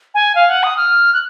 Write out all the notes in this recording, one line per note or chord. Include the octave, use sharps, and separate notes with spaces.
G#5
F5
F#5
D#6
F6
F#6